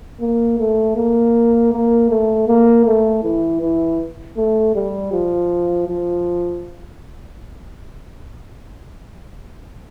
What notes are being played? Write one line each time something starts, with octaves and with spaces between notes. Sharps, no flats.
A#3
A3
A#3
A#3
A3
A#3
A3
E3
E3
A3
G3
F3
F3